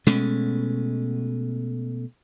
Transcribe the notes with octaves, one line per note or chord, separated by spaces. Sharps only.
B2 G#3 A3 C#4